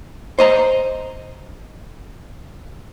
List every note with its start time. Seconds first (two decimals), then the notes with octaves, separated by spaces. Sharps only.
0.39 C5 D#5 A#5